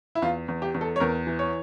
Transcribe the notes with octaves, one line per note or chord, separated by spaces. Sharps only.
E4
E2 F4
E2
G4
E2
A4
C#5
E2 A#4
E3
C#5